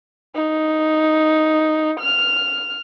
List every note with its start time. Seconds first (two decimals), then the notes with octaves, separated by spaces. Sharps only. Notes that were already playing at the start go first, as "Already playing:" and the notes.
0.35 D#4
2.00 F6